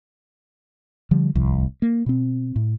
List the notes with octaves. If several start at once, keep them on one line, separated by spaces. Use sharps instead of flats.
D3 F3 G3
D1 C2 F3
A#3
B2 C4
A2